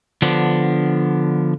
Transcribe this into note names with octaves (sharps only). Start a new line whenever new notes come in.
D3 F3 B3 D4